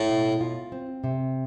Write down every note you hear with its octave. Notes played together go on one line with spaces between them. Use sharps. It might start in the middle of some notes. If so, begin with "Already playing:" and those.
Already playing: A2
B2
F4
C4
C3